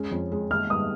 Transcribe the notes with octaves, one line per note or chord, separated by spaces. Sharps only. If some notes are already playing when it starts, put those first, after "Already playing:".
Already playing: G#3 C#4
F2
G#3
G#3 F6
G2 D#6